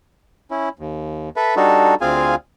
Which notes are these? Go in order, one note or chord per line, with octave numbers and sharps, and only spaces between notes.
C#4 E4
D#2
A4 B4 E5
G3 D4 D#4 F#4 A4
D2 C4 F4 G#4 F5 G#5